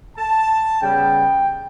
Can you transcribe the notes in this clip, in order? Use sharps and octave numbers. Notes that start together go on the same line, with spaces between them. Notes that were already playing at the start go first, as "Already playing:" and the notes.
A5
C#3 G3 B3 G5